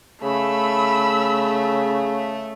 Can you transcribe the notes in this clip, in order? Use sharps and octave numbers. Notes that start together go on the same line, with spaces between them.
C#3 A3 B5 E6